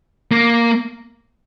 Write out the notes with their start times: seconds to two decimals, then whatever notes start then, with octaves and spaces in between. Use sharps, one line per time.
0.31 A#3